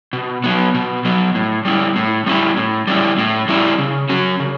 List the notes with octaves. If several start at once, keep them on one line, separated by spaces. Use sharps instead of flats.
B2
F#3 B3
B2
F#3 B3
A2
G3 C#4 E4
A2
G3 C#4 E4
A2
G3 C#4 E4
A2
G3 C#4 E4
C#3
F#3 C#4
C#3